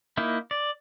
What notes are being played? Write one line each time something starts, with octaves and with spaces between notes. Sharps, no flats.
A#3 D#4 E4
D5